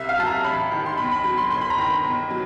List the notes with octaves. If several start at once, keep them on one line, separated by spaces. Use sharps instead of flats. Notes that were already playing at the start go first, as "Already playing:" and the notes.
Already playing: C2 E5
F5
F#3 A5
A#5
A1 B5
D#3
C6
B1 B5
B5
F#3 B5
C6
G1 C6
B5
A#5
D#3 B5
B1
F#3